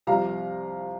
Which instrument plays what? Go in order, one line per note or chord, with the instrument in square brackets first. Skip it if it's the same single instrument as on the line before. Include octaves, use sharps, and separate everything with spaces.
[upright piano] C2 C3 F3 F5 A#5